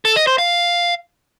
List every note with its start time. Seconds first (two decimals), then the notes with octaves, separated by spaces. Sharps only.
0.05 A4
0.16 D#5
0.27 C5
0.38 F5